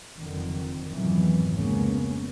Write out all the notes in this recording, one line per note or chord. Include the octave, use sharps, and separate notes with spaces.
F#1 F2 D3 D#3
F2 G#2 B2 D#3 E3 F#3
F1 C#2 G#3 A#3 B3 C#4